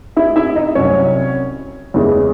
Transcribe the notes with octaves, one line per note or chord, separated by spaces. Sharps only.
E4 E5
E4 E5
D#4 D#5
C2 C3 F#3 C#4 C#5
E2 C#3 E3 G#3